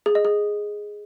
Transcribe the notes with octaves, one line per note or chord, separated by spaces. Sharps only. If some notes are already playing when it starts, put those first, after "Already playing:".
G#4
D#5
G#4